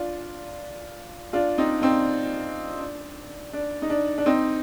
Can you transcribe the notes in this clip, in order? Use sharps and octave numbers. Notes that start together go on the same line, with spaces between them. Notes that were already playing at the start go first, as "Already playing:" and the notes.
Already playing: D4 F4
D4 F4
C4 D#4
C4 D#4
D4
D4
D#4
D4
D4
C4 D#4